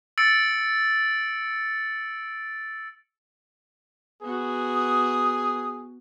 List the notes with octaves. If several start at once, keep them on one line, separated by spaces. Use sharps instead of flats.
E6 A6 C#7 D7
B3 F#4 G#4
D#6